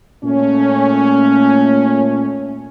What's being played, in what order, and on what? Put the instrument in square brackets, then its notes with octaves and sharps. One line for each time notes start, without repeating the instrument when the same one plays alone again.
[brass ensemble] A#2 A3 C#4